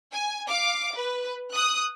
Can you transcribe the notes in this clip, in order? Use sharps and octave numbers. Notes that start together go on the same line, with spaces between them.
G#5
F5 D6
B4
D#6 F#6